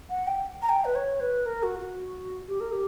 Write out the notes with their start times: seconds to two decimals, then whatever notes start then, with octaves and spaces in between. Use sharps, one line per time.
0.10 F#5
0.27 G5
0.62 A#5
0.69 G5
0.85 B4
0.95 C#5
1.20 B4
1.46 A#4
1.63 F#4
1.80 F#4
2.48 G4
2.60 A#4
2.72 G4